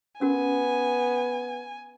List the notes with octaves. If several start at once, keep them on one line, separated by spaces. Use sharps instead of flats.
B3 C#4 F#4 A#4 G#5